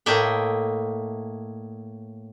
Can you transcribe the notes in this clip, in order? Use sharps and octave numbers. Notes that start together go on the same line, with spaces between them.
A2 A#3 D#5 E5 G5